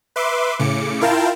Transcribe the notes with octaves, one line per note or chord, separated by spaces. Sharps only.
B4 E5 C6 D6
A2 C#3 D6 C#7
E4 F4 A#4 F5 G5 A5